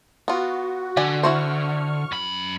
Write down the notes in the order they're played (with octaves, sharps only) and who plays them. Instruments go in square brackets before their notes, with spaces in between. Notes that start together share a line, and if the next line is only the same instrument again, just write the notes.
[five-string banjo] B3 F4 [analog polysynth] F#4
[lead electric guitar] D3 [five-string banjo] D5 F#5 G#5
[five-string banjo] E4 F#4 C5 [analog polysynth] C#6 F6
[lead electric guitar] F#2 B5